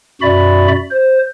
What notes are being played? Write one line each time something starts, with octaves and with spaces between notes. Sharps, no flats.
F#2 B2 F#4 D5 E5 B5
C5